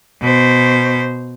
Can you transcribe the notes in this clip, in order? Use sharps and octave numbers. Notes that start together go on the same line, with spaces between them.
B2 C5